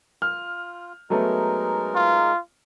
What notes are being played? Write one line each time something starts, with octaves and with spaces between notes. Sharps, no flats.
F4 F6
F#3 G#3 A3 B3 D#4 A#4
F4